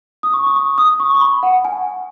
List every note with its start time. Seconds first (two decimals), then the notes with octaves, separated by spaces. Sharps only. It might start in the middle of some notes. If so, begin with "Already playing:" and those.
0.23 D#6
0.33 C#6
0.46 D#6
0.56 C#6
0.78 D#6
1.00 C#6
1.15 C#6
1.21 B5
1.43 F#5
1.65 G#5